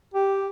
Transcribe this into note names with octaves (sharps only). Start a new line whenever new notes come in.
G4